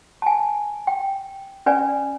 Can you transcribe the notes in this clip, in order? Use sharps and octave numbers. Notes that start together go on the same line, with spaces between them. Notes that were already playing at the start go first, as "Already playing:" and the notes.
G#5 A5
G5
C#4 B4 D5 G#5